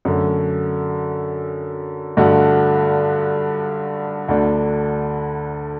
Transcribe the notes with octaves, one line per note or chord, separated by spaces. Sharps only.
F#2 D3 A3
G2 D3 A3 D4 F#4
D2 D3 A3 D4